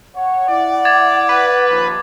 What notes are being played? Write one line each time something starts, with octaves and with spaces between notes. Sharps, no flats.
C#5 F#5
E4 D5
D6 G#6 A6
B4
D#2 F3